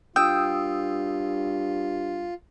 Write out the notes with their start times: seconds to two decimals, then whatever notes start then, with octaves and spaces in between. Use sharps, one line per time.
0.16 G2 F4 G5 D#6 E6